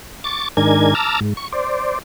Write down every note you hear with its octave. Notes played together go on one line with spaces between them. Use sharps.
C#6 D6 A6
G#2 D#3 D4 A#4 G#5 G#6
A5 A#5 D6 E6 F6
G#2
C#6
C5 D5